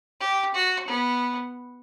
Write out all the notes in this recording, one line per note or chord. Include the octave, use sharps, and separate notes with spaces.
G4
F#4
B3